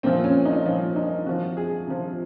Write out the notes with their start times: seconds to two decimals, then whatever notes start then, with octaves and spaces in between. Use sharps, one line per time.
0.03 A#2 F3 C4
0.24 C#4
0.45 D#4
0.65 A#2 F3
0.96 D#4
1.26 C3 F3 F#4
1.57 G#4
1.87 C3 F3